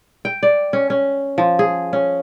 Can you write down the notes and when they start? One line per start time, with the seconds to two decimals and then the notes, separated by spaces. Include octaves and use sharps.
0.25 G5
0.43 D5
0.73 C#4
0.90 C#4
1.38 F3
1.59 G#4
1.93 C#4